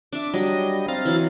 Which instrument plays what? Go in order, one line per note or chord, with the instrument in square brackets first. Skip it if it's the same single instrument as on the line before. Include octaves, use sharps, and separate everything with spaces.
[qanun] D4 E5 [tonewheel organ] D6
[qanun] F#3 G5 [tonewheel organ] G3 D#5
[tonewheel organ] C4 F5 A6 [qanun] A#5
[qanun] E3 F#3